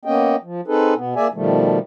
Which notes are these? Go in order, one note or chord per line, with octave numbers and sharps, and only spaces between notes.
A#3 B3 C#4 D#5 G5
F3
C4 D#4 G#4 A4 B4
B2 B3
A#3 G#4 D5 E5 G#5
B2 D#3 F3 G3 A3